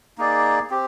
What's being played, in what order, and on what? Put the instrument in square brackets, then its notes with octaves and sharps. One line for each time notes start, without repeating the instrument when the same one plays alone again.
[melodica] A#3 D#4 G#4 D5
C4 G4